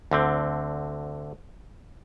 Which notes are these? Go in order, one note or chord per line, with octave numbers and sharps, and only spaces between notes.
D2 D3 C4